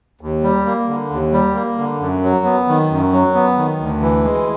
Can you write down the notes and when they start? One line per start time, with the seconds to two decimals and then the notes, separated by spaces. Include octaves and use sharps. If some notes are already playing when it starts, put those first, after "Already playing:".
0.21 D#2
0.43 G3
0.66 A#3
0.88 D3
1.11 D#2
1.33 G3
1.55 A#3
1.78 D3
2.00 F#2
2.23 F#3
2.45 B3
2.68 D#3
2.91 F#2
3.13 F#3
3.34 B3
3.57 D#3
3.80 D2
4.02 E3
4.24 G#3